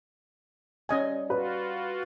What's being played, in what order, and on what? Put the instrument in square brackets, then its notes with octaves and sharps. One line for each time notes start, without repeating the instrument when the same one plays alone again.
[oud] G3 [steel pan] C#4 D#5 G#5
[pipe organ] F4 F#4 [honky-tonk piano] B4